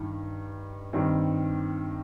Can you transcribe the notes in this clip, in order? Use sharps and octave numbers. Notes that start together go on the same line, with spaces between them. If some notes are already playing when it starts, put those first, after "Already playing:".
Already playing: G2 D#3
G2 D#3 G3 C4